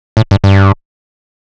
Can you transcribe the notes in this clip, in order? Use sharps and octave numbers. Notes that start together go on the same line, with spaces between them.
A2
G2
G2